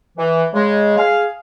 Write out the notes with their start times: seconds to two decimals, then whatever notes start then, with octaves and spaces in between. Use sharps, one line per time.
0.18 E3
0.54 C#3 G#3
0.97 G#4 F5